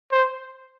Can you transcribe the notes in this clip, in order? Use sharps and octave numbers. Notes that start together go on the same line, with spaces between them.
C5